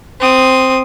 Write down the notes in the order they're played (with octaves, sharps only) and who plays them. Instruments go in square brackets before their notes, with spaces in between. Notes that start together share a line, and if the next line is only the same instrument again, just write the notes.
[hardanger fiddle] C4 D#6